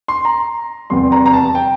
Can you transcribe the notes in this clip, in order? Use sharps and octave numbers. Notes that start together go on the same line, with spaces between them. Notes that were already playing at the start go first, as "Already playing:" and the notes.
C6
A#5
F1 E2 C3 G3 C6
A#5
A#5
A5
G5